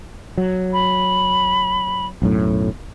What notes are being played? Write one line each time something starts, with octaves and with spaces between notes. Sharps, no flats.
F#3
B5
B1 F#2 A2